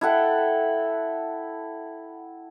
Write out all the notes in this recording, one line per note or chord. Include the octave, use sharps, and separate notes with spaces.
E4 A4 F#5 G5